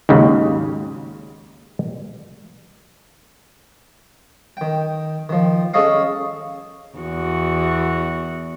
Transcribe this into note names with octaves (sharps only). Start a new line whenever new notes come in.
D#2 G#2 C#3 F#3
D#3 G5
D#3 F3
C#4 G#4 A4 C#5 D#5 F5
E2 F#4